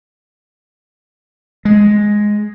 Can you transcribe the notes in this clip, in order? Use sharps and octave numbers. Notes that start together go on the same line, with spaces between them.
G#3